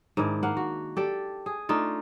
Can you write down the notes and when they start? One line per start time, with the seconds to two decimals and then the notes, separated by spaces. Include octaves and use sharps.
0.17 G#2 D#3 D4 E4
0.43 A#3 F5 F#5
0.57 F#4
0.97 G4 A4 D5
1.46 G#4
1.69 A3 D4 D#4 F4